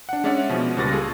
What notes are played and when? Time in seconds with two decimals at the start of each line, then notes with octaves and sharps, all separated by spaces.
0.09 D4 F#5
0.24 G#3 C#4 D5 E5 F#5
0.49 B2 F3 B3
0.77 C#2 A#2 G3 C#6 A6 A#6
0.91 F4 G#4 A4